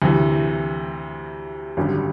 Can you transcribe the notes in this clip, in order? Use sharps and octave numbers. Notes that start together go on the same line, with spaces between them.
D2 C3 E3
G#1 F#2 D3 G3